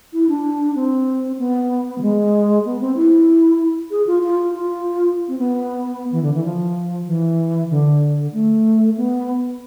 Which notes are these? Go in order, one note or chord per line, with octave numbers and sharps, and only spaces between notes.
E4
D4
C4
B3
F3
G#3
B3
C4
E4
G#4
F4
F4
F4
C4
B3
E3
D3
E3
F3
E3
D3
A3
B3